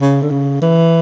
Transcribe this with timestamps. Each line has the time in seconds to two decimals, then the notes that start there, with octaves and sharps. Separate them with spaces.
0.01 C#3
0.22 D3
0.31 C#3
0.61 E3